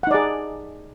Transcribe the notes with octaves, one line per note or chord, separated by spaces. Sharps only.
D#4 G#4 D5 F#5